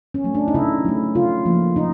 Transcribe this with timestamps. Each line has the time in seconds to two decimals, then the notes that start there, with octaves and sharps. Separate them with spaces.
0.14 C#4
0.24 F#3 A3
0.35 D4
0.48 D#4
0.54 C#3 E4
0.85 F#3 A3
1.15 C#3 F4
1.45 F3 A#3
1.76 C#3 D#4